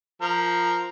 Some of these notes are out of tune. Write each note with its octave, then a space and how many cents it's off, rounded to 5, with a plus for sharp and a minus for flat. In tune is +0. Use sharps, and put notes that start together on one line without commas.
F3 +0 A#4 +0